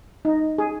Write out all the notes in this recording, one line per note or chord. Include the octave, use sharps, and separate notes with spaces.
D#4
G#4